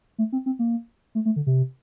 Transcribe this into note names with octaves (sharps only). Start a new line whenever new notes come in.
A3
C4
C4
A#3
A3
A3
D3
C3